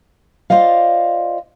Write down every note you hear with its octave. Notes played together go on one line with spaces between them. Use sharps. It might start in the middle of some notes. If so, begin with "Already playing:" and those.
F4 C5 D5 D#5 F5